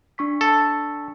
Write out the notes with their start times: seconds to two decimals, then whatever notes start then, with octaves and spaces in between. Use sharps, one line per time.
0.18 D4 C#6 B6
0.41 A4